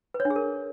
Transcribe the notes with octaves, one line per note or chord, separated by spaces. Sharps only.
B4
C#5
D4
G#4
A#4